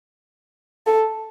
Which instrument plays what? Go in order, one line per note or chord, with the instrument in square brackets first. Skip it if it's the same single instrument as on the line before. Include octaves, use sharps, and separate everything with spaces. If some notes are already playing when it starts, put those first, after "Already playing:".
[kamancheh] A4